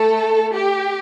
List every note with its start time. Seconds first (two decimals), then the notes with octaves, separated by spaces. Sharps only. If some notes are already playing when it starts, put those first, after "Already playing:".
Already playing: A3 A4
0.55 G4